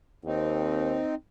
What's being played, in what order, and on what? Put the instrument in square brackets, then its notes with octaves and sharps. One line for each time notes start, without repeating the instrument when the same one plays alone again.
[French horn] D#2 [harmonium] C4 D#4